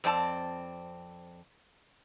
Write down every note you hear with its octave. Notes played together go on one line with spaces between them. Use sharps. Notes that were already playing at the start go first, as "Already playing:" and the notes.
F2 C4 D5 A5